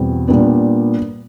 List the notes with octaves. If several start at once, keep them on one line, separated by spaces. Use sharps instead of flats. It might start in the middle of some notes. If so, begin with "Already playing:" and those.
Already playing: E2 B2 G3 C4
A#2 G3 B3 D4